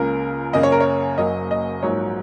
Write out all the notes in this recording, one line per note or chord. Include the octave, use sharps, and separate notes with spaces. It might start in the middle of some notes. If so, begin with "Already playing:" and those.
Already playing: C#2 C#3 A#3 A#4
F#2 C#3 A#3 D#5
C#5
A#4
C#5
F#1 F#2 F#3 A#3 D#5
D#5
A#1 G#2 F#3 A#3 C#5